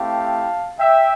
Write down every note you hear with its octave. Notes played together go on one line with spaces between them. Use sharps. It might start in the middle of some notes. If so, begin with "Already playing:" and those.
Already playing: A3 C4 E4 G4 F5 A5
E5 G5